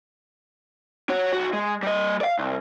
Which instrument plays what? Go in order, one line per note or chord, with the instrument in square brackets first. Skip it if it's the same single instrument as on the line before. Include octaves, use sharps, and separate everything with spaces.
[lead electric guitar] F#4 C#5
B1 F#4
G#3
G3 D#5
D5 F5
C2